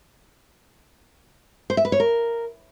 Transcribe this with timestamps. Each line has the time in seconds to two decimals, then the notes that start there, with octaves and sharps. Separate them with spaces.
1.70 C5
1.77 E5
1.85 B4
1.92 C#5
2.00 A#4